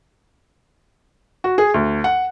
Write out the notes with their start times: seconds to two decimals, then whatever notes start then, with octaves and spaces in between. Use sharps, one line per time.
1.44 F#4
1.58 G#4
1.74 D2
2.04 F#5